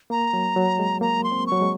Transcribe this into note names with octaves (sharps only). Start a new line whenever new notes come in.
A#3 A#5
F#3
F#3
G#3
A#3 A#5
C6
C4
C#6
F#3
G#3